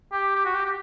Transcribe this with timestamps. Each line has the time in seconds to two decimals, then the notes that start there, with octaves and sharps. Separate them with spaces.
0.12 G4
0.36 G4
0.45 F#4
0.55 G4
0.65 G4